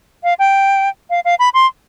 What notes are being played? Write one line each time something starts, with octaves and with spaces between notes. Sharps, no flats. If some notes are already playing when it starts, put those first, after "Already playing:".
F5
G5
F5
F5
B5
C6